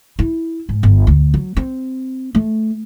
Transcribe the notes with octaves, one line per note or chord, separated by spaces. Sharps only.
E4
G#2
G1
D2
F#3
C4
A3